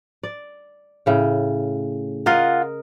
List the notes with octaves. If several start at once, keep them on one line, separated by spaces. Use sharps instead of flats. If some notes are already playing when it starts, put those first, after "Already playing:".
D5
A2 C#3 G5
F4 A#4 D#5 F#5